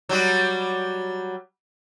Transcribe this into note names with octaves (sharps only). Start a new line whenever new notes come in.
F#3 G3 F#4